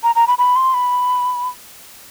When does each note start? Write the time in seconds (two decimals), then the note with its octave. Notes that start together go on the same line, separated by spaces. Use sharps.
0.03 A#5
0.15 A#5
0.27 B5
0.38 B5
0.56 C6
0.74 B5